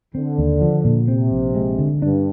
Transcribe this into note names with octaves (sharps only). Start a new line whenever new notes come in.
D3 C4
D#2
F3
A#2
C3 C4
A#1
G#3
D3
G2 D4